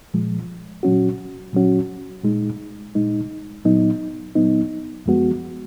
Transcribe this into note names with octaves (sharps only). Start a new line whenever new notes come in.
A#2 F3 G#3
A#2 F#3 C#4 F#4
A#2 F#3 C#4 F#4
A#2 G#3 D#4
A#2 G#3 D#4
A#2 F#3 B3 D#4
A#2 F#3 B3 D#4
F#2 F3 G#3 B3 F#4